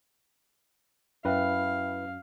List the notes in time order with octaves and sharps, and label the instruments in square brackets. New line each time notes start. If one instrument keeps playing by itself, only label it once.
[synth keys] F#2 [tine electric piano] E4 B4 [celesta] E5 G5 B5 [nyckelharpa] F5